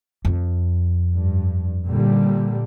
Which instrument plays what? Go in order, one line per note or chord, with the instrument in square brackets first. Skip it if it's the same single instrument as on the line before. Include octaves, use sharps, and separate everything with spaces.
[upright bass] F2
[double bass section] G2
A#2 D3 G3